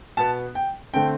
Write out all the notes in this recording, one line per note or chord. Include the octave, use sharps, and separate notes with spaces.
B2 B3 A5
G5
D3 A3 C4 G5